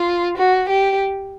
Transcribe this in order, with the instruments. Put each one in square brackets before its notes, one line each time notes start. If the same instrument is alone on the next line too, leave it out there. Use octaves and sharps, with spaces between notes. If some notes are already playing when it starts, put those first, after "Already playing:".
Already playing: [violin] F4
F#4
G4